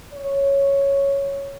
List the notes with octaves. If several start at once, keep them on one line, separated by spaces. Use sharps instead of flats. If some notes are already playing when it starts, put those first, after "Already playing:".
C#5